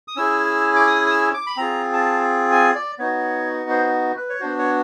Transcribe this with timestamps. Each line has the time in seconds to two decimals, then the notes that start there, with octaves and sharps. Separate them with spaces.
0.08 D#6
0.16 C#4 E4 G#4 E6
0.76 D6
0.87 D#6
1.06 D#6
1.10 E6
1.34 D6
1.47 B5
1.57 C4 F4 G#4 A#5
1.93 A5
2.52 G#5
2.75 D5
2.99 B3 D#4 F#4 C#5
3.70 C5
4.17 B4
4.29 C#5
4.40 B3 D4 F#4 C5
4.59 C#5